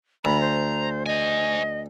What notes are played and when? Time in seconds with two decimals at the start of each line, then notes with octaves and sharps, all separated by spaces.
0.25 D2 A#5 B5
0.41 C5
1.06 C5 D#5 G#5